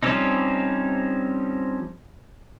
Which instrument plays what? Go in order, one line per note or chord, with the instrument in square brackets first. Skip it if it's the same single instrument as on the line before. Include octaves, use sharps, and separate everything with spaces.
[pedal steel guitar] F3 G3 C4 C#4 D#4